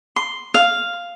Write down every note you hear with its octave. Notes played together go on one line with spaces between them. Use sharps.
C6
F5